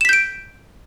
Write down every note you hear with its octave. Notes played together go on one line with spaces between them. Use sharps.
G6 B6 D7 E7